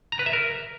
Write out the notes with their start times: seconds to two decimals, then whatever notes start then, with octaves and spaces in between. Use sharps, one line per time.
0.12 A#5
0.19 B4
0.26 E5
0.33 A#4